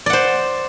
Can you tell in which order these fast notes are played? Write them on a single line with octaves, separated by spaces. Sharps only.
D5 F#5 C5